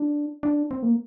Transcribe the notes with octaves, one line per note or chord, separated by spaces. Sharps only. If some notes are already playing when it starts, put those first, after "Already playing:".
Already playing: D4
D4
C4
A#3